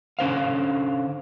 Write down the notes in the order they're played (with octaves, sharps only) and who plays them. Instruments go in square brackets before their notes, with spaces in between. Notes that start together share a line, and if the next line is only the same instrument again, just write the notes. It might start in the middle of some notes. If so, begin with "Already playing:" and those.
[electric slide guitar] D3 C#4 C5 F5